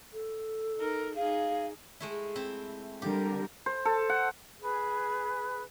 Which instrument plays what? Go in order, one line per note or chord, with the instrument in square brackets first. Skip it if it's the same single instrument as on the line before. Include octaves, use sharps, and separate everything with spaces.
[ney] A4
[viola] D#4 A#4
[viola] D#4 G#4 [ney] F5
[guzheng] G#3 A3 E4
C4 E4
[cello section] D3 G3 A#4 [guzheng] G4
[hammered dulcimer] C5
A4
F#5
[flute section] G#4 B4